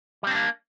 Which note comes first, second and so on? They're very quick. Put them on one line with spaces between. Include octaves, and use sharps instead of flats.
G3 C4 D4 A#3